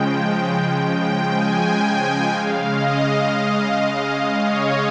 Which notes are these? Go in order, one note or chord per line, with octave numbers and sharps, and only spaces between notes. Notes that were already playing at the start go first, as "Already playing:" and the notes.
Already playing: C#3 F3 G#3 G5
G5
G#5
G5
C#3 G#3 F5
D#5
D#5
C#5